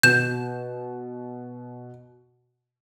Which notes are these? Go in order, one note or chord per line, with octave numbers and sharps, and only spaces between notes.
B2 G6 E7